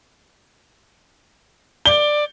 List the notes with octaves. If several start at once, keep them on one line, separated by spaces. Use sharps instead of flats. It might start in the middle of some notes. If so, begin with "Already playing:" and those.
D5 G7